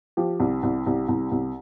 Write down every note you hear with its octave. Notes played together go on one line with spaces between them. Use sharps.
F3 G4
C2
C2
C2
C2
C2